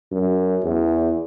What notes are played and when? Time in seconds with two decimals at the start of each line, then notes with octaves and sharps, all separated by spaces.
0.12 F#2
0.63 E2